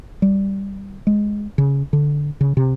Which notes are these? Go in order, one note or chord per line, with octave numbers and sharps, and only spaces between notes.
G3
G#3
C#3
D3
C#3
C3